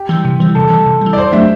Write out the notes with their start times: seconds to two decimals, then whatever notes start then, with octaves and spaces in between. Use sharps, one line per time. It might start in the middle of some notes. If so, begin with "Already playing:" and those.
Already playing: G4
0.09 E3 G3
0.25 C3
0.40 E3 G3
0.55 C3 A4
0.70 E3 G3
0.86 C3
1.01 E3 G3
1.13 D5
1.17 F#2 C5
1.32 F#3 A3 D4 G4 E5